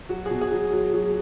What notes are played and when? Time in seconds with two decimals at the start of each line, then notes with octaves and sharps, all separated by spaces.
0.09 F#3 F#4
0.26 G#4
0.31 B2
0.42 G#4
0.52 F#3
0.73 F#3
0.94 F#3